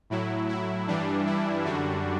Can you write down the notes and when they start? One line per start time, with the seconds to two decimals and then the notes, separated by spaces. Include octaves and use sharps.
0.10 A2 F#3 E4
0.49 E4
0.87 G2 E3 G3 D4
1.26 E4
1.65 F#2 D3 G3 D4 F#4